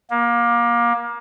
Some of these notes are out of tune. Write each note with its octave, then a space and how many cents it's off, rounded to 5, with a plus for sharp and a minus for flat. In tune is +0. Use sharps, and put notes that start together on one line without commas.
A#3 +25